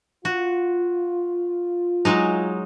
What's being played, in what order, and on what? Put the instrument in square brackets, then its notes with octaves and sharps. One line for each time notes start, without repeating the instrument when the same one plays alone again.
[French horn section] F4 [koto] F#4
[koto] F#3 G#3 D#4